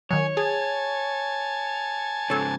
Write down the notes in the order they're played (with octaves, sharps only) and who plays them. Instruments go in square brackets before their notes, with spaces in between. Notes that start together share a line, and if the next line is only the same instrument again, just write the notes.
[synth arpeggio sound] D#3 F#3 [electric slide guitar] C#5 [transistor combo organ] G#5
[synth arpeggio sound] G#4 [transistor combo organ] G#5 A5
[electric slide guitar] G#2 C#3 [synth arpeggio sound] A4 C#5